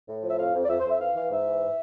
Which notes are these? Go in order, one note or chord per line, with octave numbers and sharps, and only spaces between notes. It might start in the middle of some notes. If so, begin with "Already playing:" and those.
A2
F3
E5
F2 F5
F2
D5
F2 E5
C5
F2
E5
E3 F5
E3 F5
G#2 E5
E3